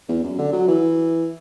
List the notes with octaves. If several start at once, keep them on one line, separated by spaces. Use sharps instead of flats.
E2
F#2
D3
F#3
E3